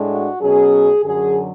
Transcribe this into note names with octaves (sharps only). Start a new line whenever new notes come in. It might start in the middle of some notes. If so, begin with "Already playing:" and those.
Already playing: A2 G#3 D4
F#4
B2 F#3 C#4 G#4
F#2 D3 F#3 G#4